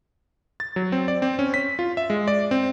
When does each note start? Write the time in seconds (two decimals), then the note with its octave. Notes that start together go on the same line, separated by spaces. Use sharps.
0.60 A6
0.76 F#3
0.92 C4
1.08 D5
1.22 C4
1.39 C#4
1.54 B6
1.79 F4
1.97 E5
2.10 G#3
2.28 D5
2.51 C4